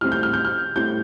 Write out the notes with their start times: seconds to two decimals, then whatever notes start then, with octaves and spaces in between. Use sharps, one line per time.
0.01 A2 G3 C4 F6
0.12 G6
0.23 F6
0.33 G6
0.45 F6
0.75 A2 G3 C4 G6